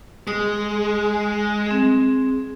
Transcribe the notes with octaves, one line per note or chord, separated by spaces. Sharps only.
G#3 D#6
C4 G#4